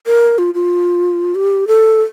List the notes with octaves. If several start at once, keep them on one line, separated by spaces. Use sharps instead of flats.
A#4
F4
F4
G4
A4